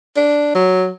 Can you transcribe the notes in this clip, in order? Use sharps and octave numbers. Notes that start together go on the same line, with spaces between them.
D4
F#3